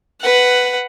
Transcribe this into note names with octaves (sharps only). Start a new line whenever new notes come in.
B4 F#5